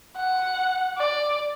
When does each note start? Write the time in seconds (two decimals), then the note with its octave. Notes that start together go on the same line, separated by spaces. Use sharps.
0.16 F#5
0.98 D5